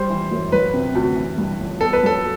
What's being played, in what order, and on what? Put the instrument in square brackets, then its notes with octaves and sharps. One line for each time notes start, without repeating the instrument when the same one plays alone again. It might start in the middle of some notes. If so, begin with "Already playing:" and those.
Already playing: [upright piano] G3 [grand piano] C5
[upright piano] E3
F#2
[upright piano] F#3 [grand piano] B4
[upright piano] C3
D2
E3
G2
G1
[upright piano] B3 [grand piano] A4
[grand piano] B4
[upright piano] F#3 [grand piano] A4